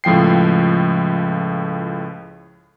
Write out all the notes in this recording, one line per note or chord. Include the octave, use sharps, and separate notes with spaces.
C#2 A2 F3 G5 C7